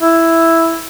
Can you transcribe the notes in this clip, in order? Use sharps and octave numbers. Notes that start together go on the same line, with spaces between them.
E4